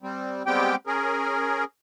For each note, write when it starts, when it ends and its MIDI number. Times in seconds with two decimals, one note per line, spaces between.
0.03 0.43 55
0.03 0.43 60
0.46 0.75 55
0.46 0.75 56
0.46 0.75 59
0.46 0.75 60
0.46 0.75 67
0.46 0.75 79
0.87 1.64 61
0.87 1.64 68
0.87 1.64 70